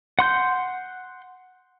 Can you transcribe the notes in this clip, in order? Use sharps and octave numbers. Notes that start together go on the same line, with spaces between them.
F#5 C6 G6